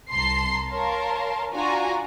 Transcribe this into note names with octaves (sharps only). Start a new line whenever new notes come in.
C2 A5 A#5 C6 C7
A#4 C#5 F5 A5 C6
D4 F4 F#4 G#5 A#5